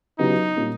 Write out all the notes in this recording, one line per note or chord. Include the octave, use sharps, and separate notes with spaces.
C#3 F#3 B3 D#4 E4 G4
A#2 G3 A#3 C#4